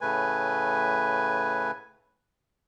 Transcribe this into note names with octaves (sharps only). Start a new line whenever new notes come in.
A2 C#3 A3 B4 G#5